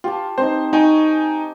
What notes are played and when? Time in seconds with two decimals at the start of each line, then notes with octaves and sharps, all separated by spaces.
0.04 F4 G4 A5
0.38 C4 D#4 C5
0.73 D#4 G5 G#5 C#6